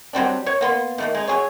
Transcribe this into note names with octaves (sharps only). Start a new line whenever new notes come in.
F#3 G3 C4 D4
C#5
A#3 B3 C6
D#3 A3 A#3
G#3 D#4
F#3 G#4 C#5